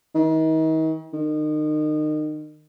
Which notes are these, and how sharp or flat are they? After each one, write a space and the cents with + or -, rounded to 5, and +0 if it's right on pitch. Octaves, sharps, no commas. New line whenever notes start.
D#3 +40
D#3 -30